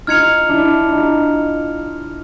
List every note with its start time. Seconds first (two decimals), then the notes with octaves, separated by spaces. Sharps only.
0.07 D#4 F4 F6 G#6 C#7 F7
0.49 D4 E4
0.90 D#4 F4